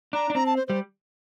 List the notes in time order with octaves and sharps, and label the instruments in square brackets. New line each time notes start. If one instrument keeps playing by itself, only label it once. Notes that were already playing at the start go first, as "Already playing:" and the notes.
[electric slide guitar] D4 [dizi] A#5
[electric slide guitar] D4
[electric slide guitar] C4 [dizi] A#5
[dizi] A5
C5
[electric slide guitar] G3 [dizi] C5